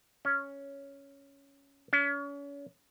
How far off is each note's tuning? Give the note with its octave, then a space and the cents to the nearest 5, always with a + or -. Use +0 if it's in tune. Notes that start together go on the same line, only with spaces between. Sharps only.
C#4 +5
C#4 +35